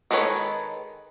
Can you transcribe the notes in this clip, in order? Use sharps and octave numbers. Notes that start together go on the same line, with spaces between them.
D#3 G#3 A4 B4 C#5